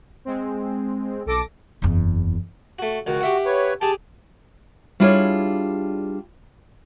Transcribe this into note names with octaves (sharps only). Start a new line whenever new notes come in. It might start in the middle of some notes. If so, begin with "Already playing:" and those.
G#3 C4
B1 A4 D6 A#6 D7
F#1 E2
A3 F#4
C#2 D#3 F#4
G4 E5 F#5
B4 C#5
G4 G#4 A5
G3 D4 E4 F4 G#4 C#5